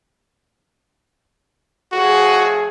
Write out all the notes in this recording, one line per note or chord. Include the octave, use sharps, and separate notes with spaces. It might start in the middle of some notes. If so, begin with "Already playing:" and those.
A2 F3 F#4 G#4